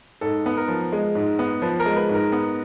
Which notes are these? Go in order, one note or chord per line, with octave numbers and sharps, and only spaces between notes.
G#2 A4
B3
A#4
F3
G#3
G#2
B3
F3 B4
A#4
G#3
B4
G#2
A#4
B3